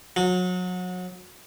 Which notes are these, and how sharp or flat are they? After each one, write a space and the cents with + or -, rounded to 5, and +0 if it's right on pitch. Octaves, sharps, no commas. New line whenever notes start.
F#3 -30